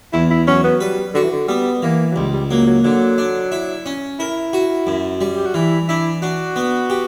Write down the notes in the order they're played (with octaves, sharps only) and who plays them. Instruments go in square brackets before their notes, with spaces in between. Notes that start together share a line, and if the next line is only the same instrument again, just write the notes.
[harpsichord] E2 [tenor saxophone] E4
[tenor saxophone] E4
[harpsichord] F#3 [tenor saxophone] C#4
[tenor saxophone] B3
[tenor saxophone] G3 [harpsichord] B4
[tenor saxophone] D3 [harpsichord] F#4
[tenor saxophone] E3
D3
[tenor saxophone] G3 [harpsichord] B3
[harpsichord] E3 [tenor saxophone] A#3
[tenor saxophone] F#3
[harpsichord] C#2 [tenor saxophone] G3
[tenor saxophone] G3
[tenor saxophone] F#3 [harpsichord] A#3
[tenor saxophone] F#3
[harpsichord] D3 [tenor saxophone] F#3
[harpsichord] D4
E4
C#4
[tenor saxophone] E4 [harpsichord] A#4
[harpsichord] F#4
F#2
G3
[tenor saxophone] G4
F#4
[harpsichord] E3 [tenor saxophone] E4
[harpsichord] D4 [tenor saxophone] E4
[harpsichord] D4 [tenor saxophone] F#4
[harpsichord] B3
G4